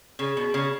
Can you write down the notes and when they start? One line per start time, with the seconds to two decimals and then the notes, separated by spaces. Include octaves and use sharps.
0.19 C#3 G#4
0.37 B2
0.54 C#3